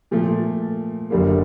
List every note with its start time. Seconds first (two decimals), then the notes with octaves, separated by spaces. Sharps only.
0.11 A#2 F3 A3
1.10 F#1 F#2 D3 G3 A#3